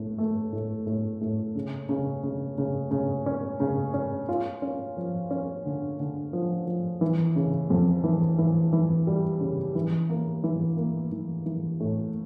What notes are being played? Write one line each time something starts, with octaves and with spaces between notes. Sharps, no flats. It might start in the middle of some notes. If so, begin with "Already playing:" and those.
Already playing: A2
A3
A2
A2
A2
C#3
C#3
C#3
C#3
C#3
C#4
C#3
C#4
F4
C#4
F3
C#4
D3
D3
F3
F3
E3
C#3
F2
E3
E3
E3
G3
C#3
E3
A#3
E3
A#3
E3
E3
A2